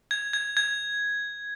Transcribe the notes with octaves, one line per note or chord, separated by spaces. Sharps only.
G#6
G#6
G#6